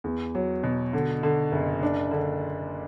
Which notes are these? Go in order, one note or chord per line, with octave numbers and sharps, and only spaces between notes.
E2
F#3
B2
D3
D3
F#1
D4
D3